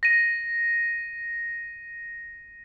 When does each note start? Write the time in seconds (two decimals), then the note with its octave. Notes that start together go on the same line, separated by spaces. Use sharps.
0.03 A#6 D#7